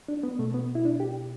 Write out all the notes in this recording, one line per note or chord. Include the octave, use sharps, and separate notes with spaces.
D4
B3
B2 A3
B3
E4
D4
G4